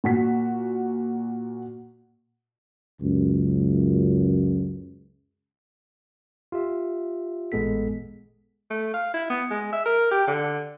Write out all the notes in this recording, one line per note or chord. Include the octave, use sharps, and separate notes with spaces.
A#2 F#4 B6
C#2 F#2
F4 G4 E5
A1 A#2 G#3 B3 A4 B6
A3
F5
E4
B3
G#3
E5
A#4
G4
D3